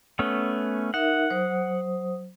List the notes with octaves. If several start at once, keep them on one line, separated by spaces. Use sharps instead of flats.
A3 B3 C#4
D#4 A#4 E5 F#5
F#3 C5 D#6